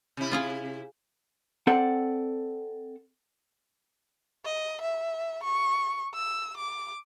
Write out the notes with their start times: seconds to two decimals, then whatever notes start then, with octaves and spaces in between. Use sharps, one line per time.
0.17 C3 E4
0.32 F4 G#4 F5
1.67 C4 A4 D5 F#5
4.45 D#5
4.81 E5
5.44 C#6
6.15 E6
6.57 D6